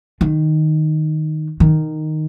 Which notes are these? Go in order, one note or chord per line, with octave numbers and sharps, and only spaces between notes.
D#3
D#3